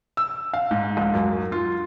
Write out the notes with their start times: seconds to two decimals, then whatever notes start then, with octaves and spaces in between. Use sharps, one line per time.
0.17 E6
0.53 F5
0.71 G#2
0.97 C#2
1.14 F#2
1.52 F4